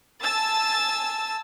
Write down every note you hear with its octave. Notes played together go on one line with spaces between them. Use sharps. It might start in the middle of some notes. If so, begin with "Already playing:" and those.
G#5 A5 E6 A6